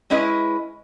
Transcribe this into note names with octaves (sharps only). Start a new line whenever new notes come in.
G#3 C#4 E4 B4 D#5